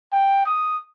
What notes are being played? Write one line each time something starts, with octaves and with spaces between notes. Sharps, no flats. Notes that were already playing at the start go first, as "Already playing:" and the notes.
G5
D#6